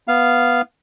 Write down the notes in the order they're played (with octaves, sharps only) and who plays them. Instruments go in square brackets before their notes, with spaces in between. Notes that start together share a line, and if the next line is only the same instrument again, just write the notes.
[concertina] B3 F5